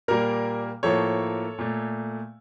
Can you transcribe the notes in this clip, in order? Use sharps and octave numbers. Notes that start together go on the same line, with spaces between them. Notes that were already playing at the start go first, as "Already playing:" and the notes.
A#2 G3 A#3 A#4
A2 F3 A#3 A4 C#5
A#2 A3